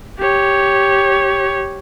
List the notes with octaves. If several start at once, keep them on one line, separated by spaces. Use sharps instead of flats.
G4 C#5